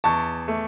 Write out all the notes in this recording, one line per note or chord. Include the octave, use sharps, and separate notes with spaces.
E2 A5 C#6
A3